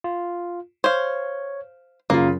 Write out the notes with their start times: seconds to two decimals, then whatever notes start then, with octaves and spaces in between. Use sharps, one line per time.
0.04 F4
0.84 C5 C#5 F5
2.10 F#2 C#3 A#3 F4